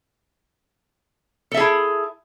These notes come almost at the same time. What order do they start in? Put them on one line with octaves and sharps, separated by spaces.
A4 E5 G#4 E4